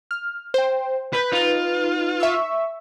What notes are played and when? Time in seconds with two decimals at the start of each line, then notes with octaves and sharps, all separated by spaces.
0.11 F6
0.54 C5 G5
1.13 B4 G6 B6
1.32 D#4 F4 B4
2.20 E5 C#6 E6